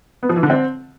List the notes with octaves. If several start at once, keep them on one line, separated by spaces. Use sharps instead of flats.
B3
F3
E3
D3
C4